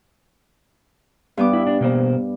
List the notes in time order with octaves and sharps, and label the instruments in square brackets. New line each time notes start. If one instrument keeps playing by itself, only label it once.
[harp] G2 B3 D6
[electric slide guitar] E4
D4
B2 A#3 C5